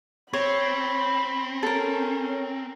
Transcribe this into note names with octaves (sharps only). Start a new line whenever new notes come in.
C4 C#5 B5
C#4 A4 A#4